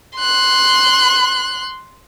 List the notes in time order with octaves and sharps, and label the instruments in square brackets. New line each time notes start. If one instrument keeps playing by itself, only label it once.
[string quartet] C6 F#6